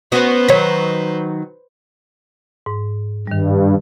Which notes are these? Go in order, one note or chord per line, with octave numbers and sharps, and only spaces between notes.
B3 C#4 F#4 B4 C5
D#3 F#3 C#5 B6
G#2
G2 D#3 G3